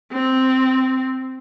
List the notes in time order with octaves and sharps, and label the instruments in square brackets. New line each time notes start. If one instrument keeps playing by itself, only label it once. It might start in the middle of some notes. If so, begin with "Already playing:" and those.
[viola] C4